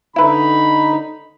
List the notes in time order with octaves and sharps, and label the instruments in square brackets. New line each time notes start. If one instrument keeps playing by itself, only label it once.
[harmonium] D3 D#4 [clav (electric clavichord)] E4 B4 [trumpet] B5